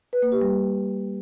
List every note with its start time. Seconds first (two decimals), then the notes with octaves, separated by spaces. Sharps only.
0.13 B4
0.22 A#3
0.32 G4
0.42 G3